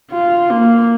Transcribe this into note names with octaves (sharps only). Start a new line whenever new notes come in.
F4
A#3